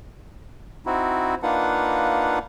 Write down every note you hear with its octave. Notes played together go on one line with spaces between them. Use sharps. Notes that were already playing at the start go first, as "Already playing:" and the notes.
C4 D#4 E4 F#4
A#3 D4 D#4 F4 B4 F#5